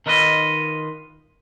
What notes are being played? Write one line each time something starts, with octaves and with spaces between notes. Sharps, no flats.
D#3 D#4 F4 B4 D#5